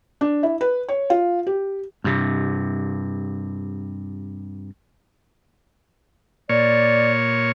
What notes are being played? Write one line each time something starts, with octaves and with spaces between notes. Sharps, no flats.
D4
E4
B4
C#5
F4
G4
G2 C3
A#2 C#5 D5